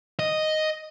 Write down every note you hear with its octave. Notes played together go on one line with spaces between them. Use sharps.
D#5